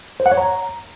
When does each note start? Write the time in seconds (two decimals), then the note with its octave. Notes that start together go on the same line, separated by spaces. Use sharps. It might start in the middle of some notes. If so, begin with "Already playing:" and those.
0.20 C5
0.26 F#5
0.32 C#5
0.38 A#5